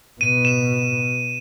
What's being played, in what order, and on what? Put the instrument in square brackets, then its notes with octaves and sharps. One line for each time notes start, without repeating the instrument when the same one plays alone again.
[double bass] B2 [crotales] D#7
[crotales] E7